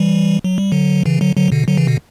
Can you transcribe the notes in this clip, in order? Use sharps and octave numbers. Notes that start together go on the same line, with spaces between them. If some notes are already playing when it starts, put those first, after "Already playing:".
Already playing: E3 G3
F#3
G3
D3 F#3
C#3 E3
D3 F#3
D3 F#3
B2 D3
D3 F#3
C#3 E3
B2 D3